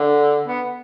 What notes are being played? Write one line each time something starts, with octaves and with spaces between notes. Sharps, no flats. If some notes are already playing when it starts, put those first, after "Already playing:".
Already playing: D3
B3